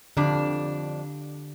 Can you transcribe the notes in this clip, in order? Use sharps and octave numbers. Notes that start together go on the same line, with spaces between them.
F2 D3 D4 G4